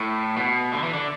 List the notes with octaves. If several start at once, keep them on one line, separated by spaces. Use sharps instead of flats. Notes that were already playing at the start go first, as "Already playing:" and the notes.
Already playing: A2
B2
D3
E3
D3